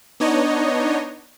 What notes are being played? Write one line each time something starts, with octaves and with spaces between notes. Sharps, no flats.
B3 D4 D#4 C#5 D#5